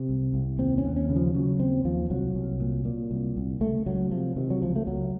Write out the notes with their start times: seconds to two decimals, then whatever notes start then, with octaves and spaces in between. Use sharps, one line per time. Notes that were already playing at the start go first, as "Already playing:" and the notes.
Already playing: C3
0.09 C2
0.34 C2
0.59 D#2 C4
0.78 C#4
0.85 D#2
0.96 C#4
1.09 C#3
1.16 F3
1.34 C#3 F#3
1.59 D#2 C4
1.85 D#2 F3
2.10 C2 F#3
2.35 C2
2.60 A#2
2.85 A#2
3.11 C2
3.36 C2
3.61 C#2 A3
3.86 C#2 F#3
4.11 C3 F3
4.36 C3 D#3
4.50 F#3
4.62 C#2 F3
4.76 A3
4.87 C#2 F#3